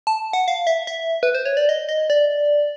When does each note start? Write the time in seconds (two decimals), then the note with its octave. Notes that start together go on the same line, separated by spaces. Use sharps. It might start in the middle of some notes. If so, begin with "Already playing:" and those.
0.07 A5
0.33 F#5
0.48 F5
0.67 E5
0.87 E5
1.23 B4
1.35 C5
1.45 C#5
1.57 D5
1.69 D#5
1.89 D#5
2.10 D5